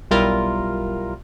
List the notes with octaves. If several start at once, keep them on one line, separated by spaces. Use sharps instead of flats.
B1 G3 E4 F4 A#4